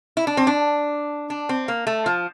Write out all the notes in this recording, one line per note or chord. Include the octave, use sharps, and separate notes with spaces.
E4
D4
C4
D4
D4
C4
A#3
A3
F3